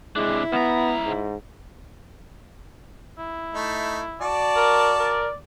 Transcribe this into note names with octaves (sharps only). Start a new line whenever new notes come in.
C3 G#3 D4 E4
C#2 B3 A#5
G#2
E4
A3 D#4
F#4 D5 A5
A#4
A#4